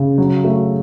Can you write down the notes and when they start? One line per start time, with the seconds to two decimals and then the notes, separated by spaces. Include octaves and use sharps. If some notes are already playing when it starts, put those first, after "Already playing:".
Already playing: C#3
0.18 F#3
0.44 A3